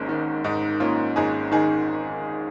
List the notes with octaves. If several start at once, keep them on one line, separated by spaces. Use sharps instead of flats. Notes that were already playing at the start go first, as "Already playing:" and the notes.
Already playing: G#1 G#2 A#3 C#4
D#3
G#2 D#4
A#3 C#4 F4
G#1 D#4 G#4
D#3 D#4 G#4